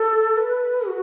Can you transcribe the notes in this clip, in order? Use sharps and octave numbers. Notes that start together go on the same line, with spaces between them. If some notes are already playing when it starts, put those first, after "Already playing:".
Already playing: A4
B4
F#4